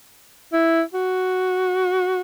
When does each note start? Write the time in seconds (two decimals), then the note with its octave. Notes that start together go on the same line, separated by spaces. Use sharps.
0.53 E4
0.94 F#4